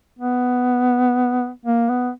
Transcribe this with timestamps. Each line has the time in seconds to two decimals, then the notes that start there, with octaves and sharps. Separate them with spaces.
0.19 B3
1.65 A#3
1.89 B3